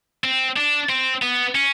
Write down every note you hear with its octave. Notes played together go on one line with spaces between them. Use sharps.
C4
D4
C4
B3
C#4